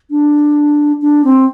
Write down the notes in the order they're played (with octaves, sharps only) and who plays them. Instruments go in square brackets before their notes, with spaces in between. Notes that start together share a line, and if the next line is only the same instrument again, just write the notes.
[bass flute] D4
D4
C4